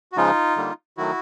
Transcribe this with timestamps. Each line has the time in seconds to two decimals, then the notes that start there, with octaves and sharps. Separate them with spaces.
0.12 F#4
0.17 C#3 F3 G#3 D#4 F4
0.57 D3 G3 A#3
0.97 D#3 F#3 A3 E4 F#4